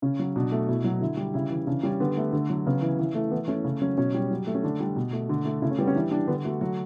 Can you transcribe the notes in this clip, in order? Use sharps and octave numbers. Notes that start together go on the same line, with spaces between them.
C#3 C#4
F#3
B2 D4
A3
B2 E4
F#3
D3 E4
G3
C#3 E4
E3
C#3 D4
G3 C#4
D3 B3
A3
D3
F#3
C#3 B3
E3
E3
A3
E3 B3
A3 C#4
C#3
F#3 C#4
B2 C#4
G3
F#3
A3
C#4
D3 D4
G3
B2
A3
D3
A3
C#3 E4
C#4
G3 B3
C#4
E3 D4
G3 D4
D3 B3
A3 F#4
F#3 F#4